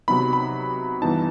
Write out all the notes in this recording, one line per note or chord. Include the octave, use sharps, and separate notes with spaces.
C3 F#3 B3 D#4 B5
B5
G2 E3 B3 D#4 A5